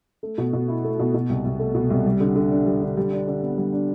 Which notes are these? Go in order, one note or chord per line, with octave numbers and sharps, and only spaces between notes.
A3
B2
B2
E4
A3
B2
B2
C2
C2
A3
B2
C2
G3
D3
D3
D4
G3
D3
G3
D4
D3
B3
G3
D4